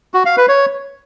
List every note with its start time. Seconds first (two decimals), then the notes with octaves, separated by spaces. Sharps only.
0.14 F#4
0.26 F5
0.37 B4
0.49 C#5